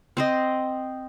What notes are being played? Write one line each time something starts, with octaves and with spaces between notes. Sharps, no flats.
C4 C5 D#5